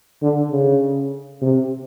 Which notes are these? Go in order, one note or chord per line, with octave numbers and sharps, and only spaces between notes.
D3
C#3
C3